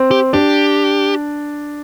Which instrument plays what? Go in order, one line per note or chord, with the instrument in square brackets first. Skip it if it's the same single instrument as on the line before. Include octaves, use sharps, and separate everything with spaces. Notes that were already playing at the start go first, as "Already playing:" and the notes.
Already playing: [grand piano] C4
[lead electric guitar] G4
[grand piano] D4 [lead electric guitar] G4